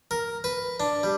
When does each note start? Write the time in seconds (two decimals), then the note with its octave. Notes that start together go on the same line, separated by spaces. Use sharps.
0.11 A#4
0.44 B4
0.80 D4
1.03 G3